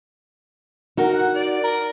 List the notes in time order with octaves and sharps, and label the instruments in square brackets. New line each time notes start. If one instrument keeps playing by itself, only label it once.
[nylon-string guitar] D#4 F#4 A#4
[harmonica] F#5
D5
A#4